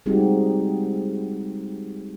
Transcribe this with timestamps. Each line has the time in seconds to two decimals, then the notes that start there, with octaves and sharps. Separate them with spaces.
0.06 G3 G#3 C4 D#4 F#4 G4